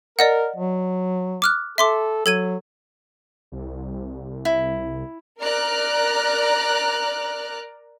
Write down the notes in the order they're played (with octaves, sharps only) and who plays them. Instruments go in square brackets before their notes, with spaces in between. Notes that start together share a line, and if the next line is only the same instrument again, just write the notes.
[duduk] A#4 [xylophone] D5 D#5 F#5
[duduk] F#3
[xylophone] D6 F6 F#6
[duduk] A4 [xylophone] E5 C6 D6
[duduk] F#3 [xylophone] A4 G#6 D#7
[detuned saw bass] C2
[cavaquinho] E4
[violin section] A#4 D5 A#5 F6 F#6